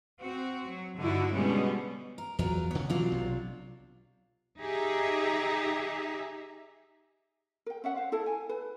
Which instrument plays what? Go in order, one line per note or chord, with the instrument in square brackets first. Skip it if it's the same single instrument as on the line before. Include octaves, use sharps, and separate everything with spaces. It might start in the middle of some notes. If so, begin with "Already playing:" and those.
[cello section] C4 F#4
F#3
G2 D3 D#4 E4 F#4
B2 D3 G3 G#3 B3 C#4
[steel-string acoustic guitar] A#4
[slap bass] E2 [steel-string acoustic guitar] F#3 F4 A#4
[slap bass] C#3 B3 [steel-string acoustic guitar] C#5
[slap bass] B2 E3 C4 [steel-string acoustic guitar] F#3 D4 F4
[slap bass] B1 C3
[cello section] D#4 G4 G#4 E5
[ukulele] A#4 G5
C#4 E5 F#5
C5 F5
E4 A4 A5
G#5
B4